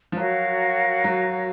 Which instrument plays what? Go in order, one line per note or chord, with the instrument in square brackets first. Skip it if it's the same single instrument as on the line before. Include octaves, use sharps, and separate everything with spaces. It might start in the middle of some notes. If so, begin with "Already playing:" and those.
[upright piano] F3
[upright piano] F#3 [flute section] F#4 A#4 C#5 F5
[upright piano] F#3